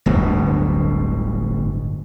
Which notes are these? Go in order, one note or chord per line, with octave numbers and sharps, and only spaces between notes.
D1 G1 D2 B2